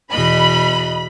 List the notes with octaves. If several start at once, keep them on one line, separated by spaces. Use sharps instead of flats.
E2 B2 D#5 B5